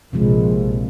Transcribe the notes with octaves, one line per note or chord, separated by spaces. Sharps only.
A#1 C3 F3 G#3